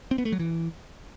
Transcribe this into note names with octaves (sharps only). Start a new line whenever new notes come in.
C4
B3
A3
F#3
E3